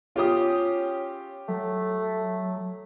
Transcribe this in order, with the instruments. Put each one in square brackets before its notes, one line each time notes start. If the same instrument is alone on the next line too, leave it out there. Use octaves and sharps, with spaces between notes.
[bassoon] C#4 [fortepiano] F4 G4 D#6
[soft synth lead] F#3 [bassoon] A3